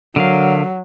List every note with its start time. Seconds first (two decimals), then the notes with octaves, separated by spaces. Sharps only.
0.16 D3 F#3 A#4 F5